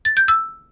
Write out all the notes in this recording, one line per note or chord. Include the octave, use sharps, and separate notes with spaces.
A6
G6
E6